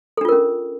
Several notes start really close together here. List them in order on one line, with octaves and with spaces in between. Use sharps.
A4 D4 F4 A#4 C#4